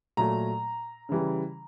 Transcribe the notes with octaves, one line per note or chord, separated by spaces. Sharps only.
A#2 F#3 A3 A#5
C#3 E3 G3